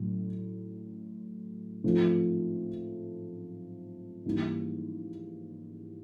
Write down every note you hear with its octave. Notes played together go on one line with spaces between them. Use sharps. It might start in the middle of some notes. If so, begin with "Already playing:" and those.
Already playing: A2 F#3
G#2 F3 A3 C4 F4
G#2 E3 G3 A#3